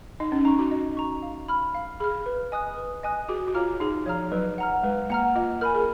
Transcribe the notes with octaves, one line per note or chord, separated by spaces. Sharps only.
D#4 D#5
C#4
D#4 A#5 C#6
F#4
D#5
A#5 C#6
F5
B5 F6
F5
G#4 B5 F6
B4
D#5 G#5 D#6 F#6
B4
D#5 G#5 D#6 F#6
F#4 G#4
F#4
F4 C#5 F5 A#5 F6
D#4 G#4
F3 C#5 F5 A#5 F6
F#3 B4
F#5 A#5 F6
G#3 B4
A#3 F#5 A#5 F6
F4 D#5
A#4 G#5 B5 F6
G#4